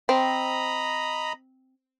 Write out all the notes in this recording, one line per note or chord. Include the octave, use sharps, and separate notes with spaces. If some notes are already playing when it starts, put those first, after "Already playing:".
C4 D#5 A#5 B5